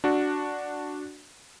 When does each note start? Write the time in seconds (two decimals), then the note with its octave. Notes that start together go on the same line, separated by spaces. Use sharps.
0.04 D4 F#4